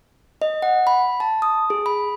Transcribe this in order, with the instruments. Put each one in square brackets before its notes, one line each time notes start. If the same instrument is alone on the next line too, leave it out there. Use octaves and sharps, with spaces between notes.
[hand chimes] D#5
F#5
B5
A5
D#6
G#4
B5